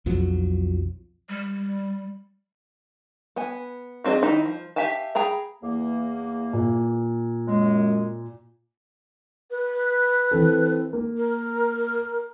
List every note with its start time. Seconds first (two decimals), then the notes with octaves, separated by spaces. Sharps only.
0.06 B1 F2 F3 F#3
1.29 G3
3.36 B3 G#5
4.04 F3 C4 D4 G#4 D#5
4.23 D#3 D#4 E4 D#5
4.46 F3
4.76 G4 E5 F5 G#5 A5
5.15 G#4 G5 A#5 B5
5.62 E2 A#3
6.53 A#2
7.47 F#2 G#3
9.50 B4
10.31 E3 C4 A4
10.93 A#3
11.17 A#4